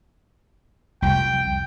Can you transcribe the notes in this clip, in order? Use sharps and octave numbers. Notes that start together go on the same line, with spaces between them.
C2 F2 G5